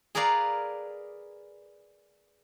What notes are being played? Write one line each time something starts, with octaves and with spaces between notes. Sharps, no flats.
G#4 A#4 B4 D5 F5